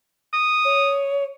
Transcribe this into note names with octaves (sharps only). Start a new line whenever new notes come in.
D#6
C#5